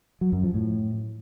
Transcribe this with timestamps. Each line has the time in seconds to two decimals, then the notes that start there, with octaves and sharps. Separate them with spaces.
0.21 F#3
0.32 F#2
0.43 F3
0.54 A2